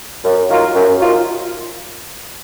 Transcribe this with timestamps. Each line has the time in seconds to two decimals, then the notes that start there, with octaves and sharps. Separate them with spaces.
0.24 F#2
0.48 D#3 F#3 A#3 F4
0.75 F#2
1.00 D#3 F#3 A#3 F4